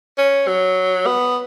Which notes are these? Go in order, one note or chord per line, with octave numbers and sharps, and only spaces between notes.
C#4
F#3
B3